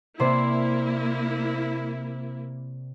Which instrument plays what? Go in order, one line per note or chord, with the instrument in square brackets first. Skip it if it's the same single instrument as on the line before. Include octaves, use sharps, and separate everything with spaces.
[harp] C3 C5 D5 [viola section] A#3 E4